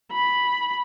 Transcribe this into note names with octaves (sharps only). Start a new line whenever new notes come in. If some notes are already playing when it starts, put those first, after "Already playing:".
B5